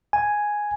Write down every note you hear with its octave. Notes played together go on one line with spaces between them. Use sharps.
G#5